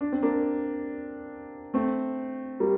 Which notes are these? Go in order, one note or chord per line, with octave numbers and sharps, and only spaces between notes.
D4
C4
A#3 D4
A3 C4
G3 A#3